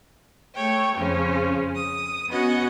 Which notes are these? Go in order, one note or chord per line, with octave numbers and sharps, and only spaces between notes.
A3 C#5 G5
F2 C#3 F3 C#4
D#6
B3 C#4 F#4 D#5 F#5